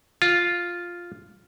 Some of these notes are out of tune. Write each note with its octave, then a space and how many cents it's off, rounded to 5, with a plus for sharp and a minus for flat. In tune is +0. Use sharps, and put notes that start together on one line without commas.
F4 +0